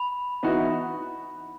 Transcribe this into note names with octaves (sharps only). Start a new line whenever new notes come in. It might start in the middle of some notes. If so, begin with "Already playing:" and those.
Already playing: B5
E3 B3 D#4 F#4